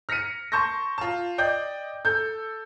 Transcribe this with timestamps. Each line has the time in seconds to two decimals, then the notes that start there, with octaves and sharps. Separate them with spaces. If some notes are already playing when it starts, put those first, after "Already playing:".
0.09 F6 A#6 B6 C#7 D#7
0.52 A5 C6 C#6 G6 A#6
0.98 F4 A5
1.38 D5 D#5 G5 G6
2.05 A4 G6